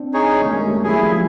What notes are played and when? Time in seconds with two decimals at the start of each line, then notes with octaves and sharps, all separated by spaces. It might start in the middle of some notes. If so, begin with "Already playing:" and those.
Already playing: C4 D4
0.14 D#4 G#4 C#5
0.41 A3
0.48 G#3 A#3 C#4
0.66 G3 A3
0.83 F#3 G#3 E4 G#4
1.01 F3 G3